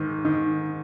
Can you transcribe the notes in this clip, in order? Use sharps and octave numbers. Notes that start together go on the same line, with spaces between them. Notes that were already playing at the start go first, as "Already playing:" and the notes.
Already playing: G#2 D#3 D#4
D#3 D#4